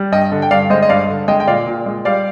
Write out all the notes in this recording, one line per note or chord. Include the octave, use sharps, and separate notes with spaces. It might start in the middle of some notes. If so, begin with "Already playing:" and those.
Already playing: G3
G2 D#5 G5
D3
G5
G2 D5 F5
G#3 C5 D#5
D#5
G2 D5 F5
D3
G#3 D#5 G5
G5
A#2 D5 F5
A#2
G#3
G3 D5 F5